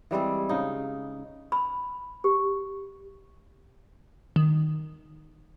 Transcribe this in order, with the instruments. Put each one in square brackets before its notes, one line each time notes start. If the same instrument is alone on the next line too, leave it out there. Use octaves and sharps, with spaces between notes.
[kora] E3 G3 G#3 C4
C#3 D#4
[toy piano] B5
G4
[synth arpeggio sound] D#3